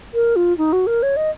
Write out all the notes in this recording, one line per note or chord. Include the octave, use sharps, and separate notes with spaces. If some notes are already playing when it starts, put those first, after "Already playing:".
A#4
F4
D#4
F#4
A#4
C#5
D#5